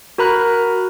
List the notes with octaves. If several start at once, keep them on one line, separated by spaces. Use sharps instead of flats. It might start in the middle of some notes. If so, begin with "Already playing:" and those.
F#4 A#4 A#5 B5 F#6